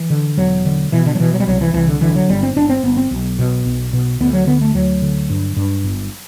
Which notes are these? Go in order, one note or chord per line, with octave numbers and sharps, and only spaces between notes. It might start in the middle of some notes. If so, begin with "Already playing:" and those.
Already playing: E3
D3
E1 F#3
D3
B2 E3
D3
F#3
B2 E3
F#3
G3
C2 F#3
E3
C2 E3
D3
D3 E3
F#3
G1 G3
C4
G1 D4
C4
G1 B3
C4
B1
B2
B1
B2
D2 B3
F#3
D3 B3
A3
D2 F#3
D3
G2
G2
G1